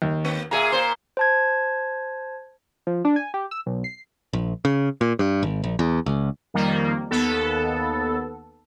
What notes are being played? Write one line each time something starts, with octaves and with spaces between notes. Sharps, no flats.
D#2
A#3
A#2 G#4 E5 A#5
A#2 C5
C5 A5 G#6
F3
D4
G#5
G4
E6
B1
C7
A#1
C#3
A#2
G2
G#1
A#1
E2
C#2
F2 D#3 G3 A#3
D#2 B3 A4